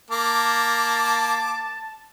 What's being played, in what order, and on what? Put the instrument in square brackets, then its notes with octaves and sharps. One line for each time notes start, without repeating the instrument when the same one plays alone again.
[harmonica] A#3 D6 [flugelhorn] A5